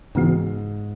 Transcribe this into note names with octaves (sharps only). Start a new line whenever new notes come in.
G#2 C#3 E3 B3 F#4